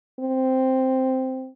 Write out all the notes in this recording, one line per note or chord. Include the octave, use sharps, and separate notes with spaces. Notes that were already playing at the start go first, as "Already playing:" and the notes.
C4